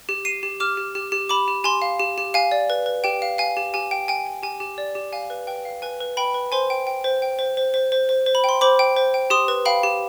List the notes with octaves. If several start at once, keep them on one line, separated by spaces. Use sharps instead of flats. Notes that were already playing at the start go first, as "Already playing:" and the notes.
G4
G4 C7 D#7
G4
G4 D6 F6
G4
G4
G4
G4 B5 D6
G4
G4 G#5 C6
F5
G4
G4
F5 G#5
D5
B4
B4
G4 G5
F5
F5 G#5
G4
G4 G#5
G5
G5 G#5
G5
G4 G#5
G4
D5
G4
F5 G#5
B4
B4 G5
F5
B4 G#5
B4
B4 G5 B5
B4
C5 G#5 C6
G5
G5
C5
G5
C5
C5
C5
C5
C5
C5
B5
G5 C6
C5 B5 D6
G5
C5
G5
G4 C6 D#6
B4
F5 G5 B5
G4